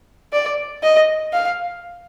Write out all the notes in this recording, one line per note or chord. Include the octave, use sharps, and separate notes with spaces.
D5
D#5
F5